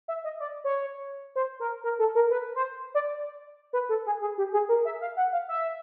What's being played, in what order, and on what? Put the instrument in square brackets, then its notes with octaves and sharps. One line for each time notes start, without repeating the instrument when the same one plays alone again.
[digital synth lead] E5
D#5
D5
C#5
C5
A#4
A#4
A4
A#4
B4
C5
D5
B4
A4
G#4
G#4
G4
G#4
A#4
E5
F5
F#5
F5
E5